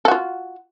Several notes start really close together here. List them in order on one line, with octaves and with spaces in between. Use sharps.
A4 F#4 F4